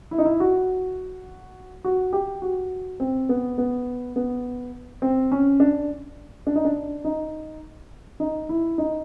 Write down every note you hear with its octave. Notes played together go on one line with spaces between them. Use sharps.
E4
D#4
E4
F#4
F#4
G4
F#4
C4
B3
B3
B3
C4
C#4
D4
D4
D#4
D4
D#4
D#4
E4
D#4